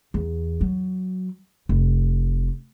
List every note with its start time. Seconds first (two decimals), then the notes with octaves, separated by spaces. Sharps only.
0.14 E2
0.61 F#3
1.69 F1